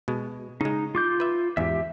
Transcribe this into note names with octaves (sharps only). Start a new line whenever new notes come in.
B2 G#3
C#3 G#3 D#4
F4 D6 G6
B4 E5
E2 G#2 G4 E5